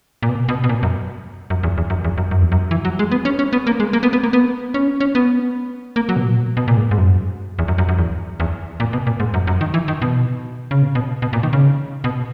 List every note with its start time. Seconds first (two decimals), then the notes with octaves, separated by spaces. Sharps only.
0.22 A#2
0.29 B2
0.49 B2
0.64 B2
0.69 A#2
0.83 F#2
1.50 F#2
1.63 E2
1.78 E2
1.90 F#2
2.04 E2
2.18 F#2
2.31 F#2
2.42 E2
2.52 F#2
2.71 E3
2.85 F#3
2.99 G#3
3.12 B3
3.25 C#4
3.39 C#4
3.53 B3
3.67 A#3
3.80 G#3
3.93 A#3
4.03 B3
4.13 B3
4.23 A#3
4.33 B3
4.74 C#4
5.00 C#4
5.15 B3
5.96 A#3
6.09 F#3
6.16 B2
6.23 A#2
6.57 B2
6.68 A#2
6.77 G#2
6.91 G#2
6.98 F#2
7.59 E2
7.68 F#2
7.78 F#2
7.89 F#2
7.98 E2
8.40 E2
8.80 A#2
8.93 B2
9.07 A#2
9.20 G#2
9.34 F#2
9.47 F#2
9.61 D#3
9.74 E3
9.88 D#3
10.02 B2
10.71 C#3
10.82 B2
10.95 B2
11.22 B2
11.33 A#2
11.43 D#3
11.53 C#3
12.04 B2